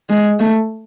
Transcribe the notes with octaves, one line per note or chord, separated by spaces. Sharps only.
G#3
A3